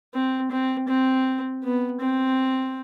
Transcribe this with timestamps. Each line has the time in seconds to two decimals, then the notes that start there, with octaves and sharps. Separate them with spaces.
0.14 C4
0.51 C4
0.88 C4
1.63 B3
2.01 C4